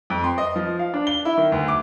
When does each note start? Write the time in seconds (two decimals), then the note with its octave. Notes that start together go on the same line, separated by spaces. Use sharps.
0.10 F2
0.24 C6
0.38 D#5
0.56 F3
0.79 F5
0.94 D4
1.07 G7
1.25 E4
1.37 D#3
1.52 D2
1.68 D6